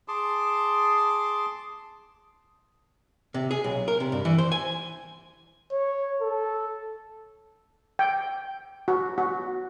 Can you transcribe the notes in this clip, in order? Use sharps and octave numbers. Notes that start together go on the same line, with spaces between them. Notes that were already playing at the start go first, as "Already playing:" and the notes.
G#4 A5 C6 D6
C3
G#4
B1
A#4
C3
G2
E3
C5
G#5
C#5
A4
G5
F#4
F#4